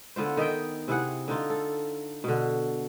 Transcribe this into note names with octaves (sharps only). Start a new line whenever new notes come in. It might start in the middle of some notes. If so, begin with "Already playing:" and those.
D3 B3 F4 C5
D#3 D#5 E5 G5
C3 E4 G#4 F#5
D3 D#4 F4
A4
B2 D3